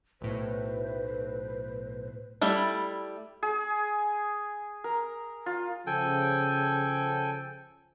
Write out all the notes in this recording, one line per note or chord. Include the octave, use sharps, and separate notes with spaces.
B1 A2 B4 C5
G3 A3 E4
G#4
A#4
F4
C#3 F3 A4 G5 G#5